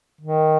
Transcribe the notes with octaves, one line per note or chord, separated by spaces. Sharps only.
D#3